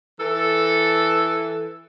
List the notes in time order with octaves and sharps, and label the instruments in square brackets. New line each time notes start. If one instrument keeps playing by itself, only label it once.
[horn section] E3 A4